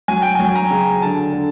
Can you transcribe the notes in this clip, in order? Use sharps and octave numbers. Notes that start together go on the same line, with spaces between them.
F#3 G#5
G5
F#3 G#5
A#5
C#3
D3 A5
D3